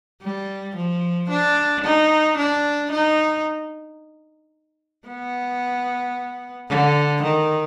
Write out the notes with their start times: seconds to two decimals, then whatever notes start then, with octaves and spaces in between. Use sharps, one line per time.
0.23 G3
0.76 F3
1.30 D4
1.85 D#4
2.38 D4
2.92 D#4
5.08 B3
6.69 D3
7.23 D#3